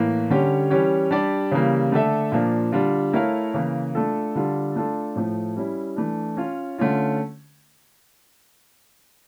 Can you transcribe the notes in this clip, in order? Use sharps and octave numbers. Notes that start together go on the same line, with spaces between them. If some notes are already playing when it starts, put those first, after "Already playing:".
Already playing: A2 E3 A#3
D3 G3 C#4 G4 C#5
E3 G3 C#4 G4 C#5
G3 D4 G4 D5
C#3 E3 G3 A#3
D3 A3 D4 A4 E5
A#2 F3 A#3 D4
D3 G3 D4 F4
A3 E4 A#4 C#5 F5
C#3 E3 A#3
A3 D4 F4 A4
D3 G3 D4 F4 A4
A3 D4 F4 A4
A2 F3 A3
G3 C#4 E4
E3 A3 D4
C#4 F4 C#5
D3 A3 C#4 F4